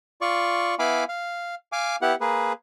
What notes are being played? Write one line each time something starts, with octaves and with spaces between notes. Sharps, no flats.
F4 D5 C#6
B3 E4 F5 G#5 B5 D6
F5
F5 G#5 D6
B3 E4 G4 F#5
A#3 G#4 B4